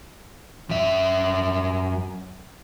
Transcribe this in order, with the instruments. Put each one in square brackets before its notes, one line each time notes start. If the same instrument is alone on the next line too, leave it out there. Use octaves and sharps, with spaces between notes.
[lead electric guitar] F#2 E5